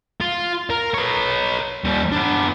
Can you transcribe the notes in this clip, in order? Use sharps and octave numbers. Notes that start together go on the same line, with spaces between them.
F4
A#4
B4 C#5
D#2 G3
B3 D4